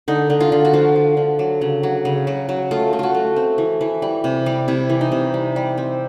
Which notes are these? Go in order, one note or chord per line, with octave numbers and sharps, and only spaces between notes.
D3 D#4
D3
F4
D3
F#4
F3 F4
F3
D3
F#3
C#3
F#3
C#3
F#3
F#3
A3 F4
A3
F4 F#4
A3
C4
E3
E3
G3
C3
G3
C3 E4
E3
D#4
C3
G3
G3
C4